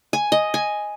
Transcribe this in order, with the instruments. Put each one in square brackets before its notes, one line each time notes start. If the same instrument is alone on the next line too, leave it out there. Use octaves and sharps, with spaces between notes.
[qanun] G#5
D#5
G#5